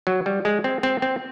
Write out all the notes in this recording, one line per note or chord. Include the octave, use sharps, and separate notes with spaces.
F#3
G3
G#3
C4
C4
C4